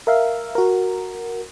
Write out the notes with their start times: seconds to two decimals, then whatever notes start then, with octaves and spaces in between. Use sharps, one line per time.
0.07 A#4 E5 F5
0.55 F#4 A#4